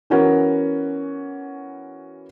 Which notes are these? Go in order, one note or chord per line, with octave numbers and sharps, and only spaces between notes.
E3 B3 C#4 F#4 A#4